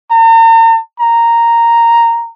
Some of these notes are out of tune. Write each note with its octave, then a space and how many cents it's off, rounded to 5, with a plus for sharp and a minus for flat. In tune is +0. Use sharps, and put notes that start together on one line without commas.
A#5 -40
A#5 -5